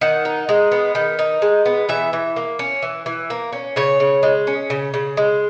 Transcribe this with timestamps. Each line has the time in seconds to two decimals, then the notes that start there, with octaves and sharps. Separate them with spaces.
0.01 D#3 F#5
0.25 D#4
0.49 G#3
0.72 B3
0.95 D#3
1.19 D#4
1.42 G#3
1.66 B3
1.89 E3 E5
2.13 E3
2.36 A#3
2.59 C#4
2.83 E3
3.06 E3
3.30 A#3
3.53 C#4
3.76 C#3 C#5
4.00 C#3
4.23 G#3
4.47 C#4
4.70 C#3
4.94 C#3
5.17 G#3